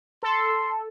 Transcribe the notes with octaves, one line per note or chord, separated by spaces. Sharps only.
A4 C6